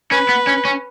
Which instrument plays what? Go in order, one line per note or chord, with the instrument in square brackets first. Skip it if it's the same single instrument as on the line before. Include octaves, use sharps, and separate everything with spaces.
[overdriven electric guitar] C#4 [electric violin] B4
[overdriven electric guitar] B3
C#4
C#4